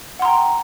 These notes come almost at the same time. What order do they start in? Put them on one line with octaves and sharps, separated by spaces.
F#5 C6 A#5 G5